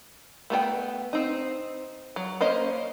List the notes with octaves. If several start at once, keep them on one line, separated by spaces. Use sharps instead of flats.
A3 B3 A#4 G5
C4 D#4
F#3
A#3 C#4 C5 D#5